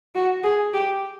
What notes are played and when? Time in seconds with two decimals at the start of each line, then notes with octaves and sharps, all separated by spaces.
0.15 F#4
0.43 G#4
0.73 G4